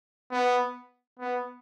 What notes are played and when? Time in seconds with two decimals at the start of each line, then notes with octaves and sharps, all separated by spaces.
0.31 B3
1.19 B3